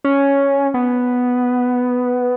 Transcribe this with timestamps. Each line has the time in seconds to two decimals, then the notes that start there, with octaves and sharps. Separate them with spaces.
0.04 C#4
0.74 B3